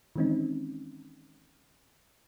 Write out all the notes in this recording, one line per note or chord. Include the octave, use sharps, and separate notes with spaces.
D#3 E3 G#3 C4 C#4 D#4